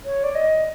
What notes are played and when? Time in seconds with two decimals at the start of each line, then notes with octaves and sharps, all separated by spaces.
0.05 C#5
0.23 D5
0.35 D#5